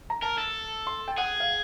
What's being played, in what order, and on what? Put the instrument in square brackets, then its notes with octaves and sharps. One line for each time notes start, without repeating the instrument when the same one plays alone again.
[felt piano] A#5
[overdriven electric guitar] A#4 [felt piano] A5
[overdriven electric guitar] A4
[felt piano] C6
G5
[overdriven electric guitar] G#4 [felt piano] F#5
[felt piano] F5